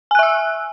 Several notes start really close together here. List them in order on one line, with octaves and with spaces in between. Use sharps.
G#5 F#6 E5 E6